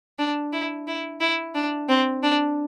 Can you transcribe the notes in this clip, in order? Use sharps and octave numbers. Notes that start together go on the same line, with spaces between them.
D4
E4
E4
E4
D4
C4
D4